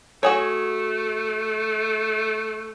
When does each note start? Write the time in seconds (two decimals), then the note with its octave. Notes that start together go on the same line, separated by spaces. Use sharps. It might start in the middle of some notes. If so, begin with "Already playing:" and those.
0.23 A3 F#4 G#4 C#5